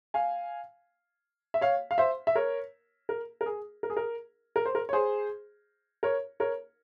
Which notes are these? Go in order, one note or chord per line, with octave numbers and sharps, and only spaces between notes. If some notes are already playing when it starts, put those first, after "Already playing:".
F5 G#5
E5
C#5 F5
F5
C5 E5
E5
A#4 C#5
A#4
A#4
G#4
A#4
G#4
A#4
A#4
C5
A#4
C#5
G#4 C5
A#4 C#5
A#4 C#5